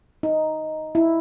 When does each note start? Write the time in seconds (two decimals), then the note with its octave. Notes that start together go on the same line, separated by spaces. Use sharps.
0.23 D#4
0.95 E4